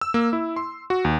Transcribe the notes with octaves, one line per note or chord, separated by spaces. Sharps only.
E6
A#3
E4
C6
F#4
D#2